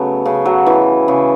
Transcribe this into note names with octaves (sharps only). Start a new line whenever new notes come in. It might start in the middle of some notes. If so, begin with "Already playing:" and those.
Already playing: C#3 F#3 A3 B3
C#3
F#3
E3
C#3